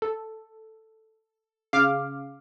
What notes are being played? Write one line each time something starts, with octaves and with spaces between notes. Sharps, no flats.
A4
C#3 F5 D6 F6